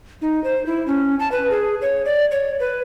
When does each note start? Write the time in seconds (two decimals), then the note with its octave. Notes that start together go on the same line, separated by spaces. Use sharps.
0.22 D#4
0.44 C5
0.66 E4
0.87 C#4
1.20 A5
1.32 B4
1.50 G#4
1.81 C#5
2.05 D5
2.31 C#5
2.60 B4